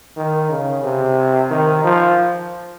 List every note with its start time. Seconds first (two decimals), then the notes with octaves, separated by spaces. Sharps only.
0.17 D#3
0.50 C#3
0.84 C3
1.50 D#3
1.84 F3